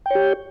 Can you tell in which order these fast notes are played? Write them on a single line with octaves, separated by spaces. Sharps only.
G5 C#5 G4